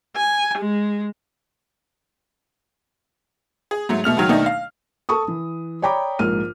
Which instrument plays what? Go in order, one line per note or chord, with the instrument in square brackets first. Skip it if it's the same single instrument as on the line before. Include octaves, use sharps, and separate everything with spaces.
[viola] G#5
G#3
[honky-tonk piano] G#4
G#2 F#3 A3
B2 A3 F6 F7
C#2 D#3 F#3
B2 D#3 A3 D4 D#4
F5
[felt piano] A4 A5 C#6 D#6
E3
C#5 D5 G5 A#5 B5 D6
A#1 G#2 A#4 F6 D#7